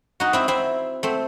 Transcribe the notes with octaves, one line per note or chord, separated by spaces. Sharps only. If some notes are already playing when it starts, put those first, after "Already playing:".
D#4 F#4
C4 E4
C4 E4
A3 C4